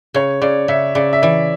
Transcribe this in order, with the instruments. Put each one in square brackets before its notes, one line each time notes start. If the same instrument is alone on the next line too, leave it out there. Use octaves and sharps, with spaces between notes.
[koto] C#3 [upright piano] C#5
[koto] C#3 [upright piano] D5
[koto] C#3 [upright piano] E5
[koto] C#3 [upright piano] D5
[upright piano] E5
[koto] E3 [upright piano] D5